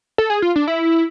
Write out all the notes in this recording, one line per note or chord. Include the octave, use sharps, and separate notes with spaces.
A4
G#4
F4
D4
E4